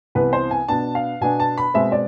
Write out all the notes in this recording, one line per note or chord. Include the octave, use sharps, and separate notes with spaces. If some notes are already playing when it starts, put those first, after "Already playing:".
C2 C3 E3 B3 B4
C5
G#5
B2 B3 D4 A5
F5
B2 B3 D4 G#5
A5
B5
B2 G#3 C4 E5
D5